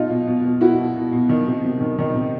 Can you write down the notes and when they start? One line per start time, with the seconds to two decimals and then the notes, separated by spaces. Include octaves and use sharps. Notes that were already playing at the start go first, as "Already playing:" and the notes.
Already playing: B2 D#4 F4
0.10 B2
0.27 B2
0.44 B2
0.61 B2 E4 F#4
0.78 B2
0.96 B2
1.13 B2
1.29 D#3
1.47 C3
1.64 C3
1.81 D#3
1.98 D#3 D#4
2.15 C3